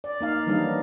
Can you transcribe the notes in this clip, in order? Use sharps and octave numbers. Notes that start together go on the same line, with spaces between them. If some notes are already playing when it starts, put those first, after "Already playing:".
D5
A#3 D#4 F5
D#3 E3 F#3 G3 D4 D#4